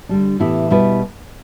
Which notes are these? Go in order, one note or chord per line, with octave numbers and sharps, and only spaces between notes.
D3 G3 D4
A2 E3 B3 E4 G4
B2 G3 E4 B4